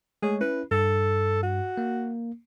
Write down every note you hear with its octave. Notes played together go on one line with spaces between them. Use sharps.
G#3 A3 G#4 C#5
C#4 E4 B4
G2 A4
F#4
A#3